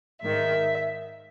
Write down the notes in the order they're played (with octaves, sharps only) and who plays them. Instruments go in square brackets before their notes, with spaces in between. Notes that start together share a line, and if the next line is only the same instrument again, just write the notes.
[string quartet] G#2 D#3 E5